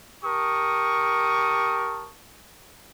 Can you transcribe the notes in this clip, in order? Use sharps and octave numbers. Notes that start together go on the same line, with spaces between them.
G4 A#4 A5 C#6 D#6